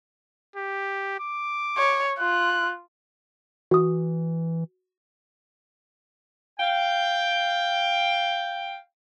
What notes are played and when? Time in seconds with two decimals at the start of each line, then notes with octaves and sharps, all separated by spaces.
0.56 G4
1.20 D6
1.78 C#5
2.19 F4 F#6
3.71 E3 F#4 D#6
6.60 F5 G5